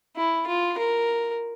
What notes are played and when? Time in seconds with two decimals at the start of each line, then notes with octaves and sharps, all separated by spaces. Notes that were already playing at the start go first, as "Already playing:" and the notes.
0.17 E4
0.47 F4
0.78 A#4